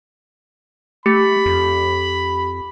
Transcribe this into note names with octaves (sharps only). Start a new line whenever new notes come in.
A3 G4 B5
F2